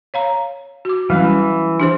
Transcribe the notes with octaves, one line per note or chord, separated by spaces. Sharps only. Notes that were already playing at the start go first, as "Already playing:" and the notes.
C#5 F5 A#5
F#4 D6
E3 F#3 G3 C#4
D4 G4 C5